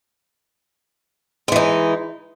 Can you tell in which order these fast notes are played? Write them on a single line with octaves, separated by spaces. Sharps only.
G#3 E3 D#4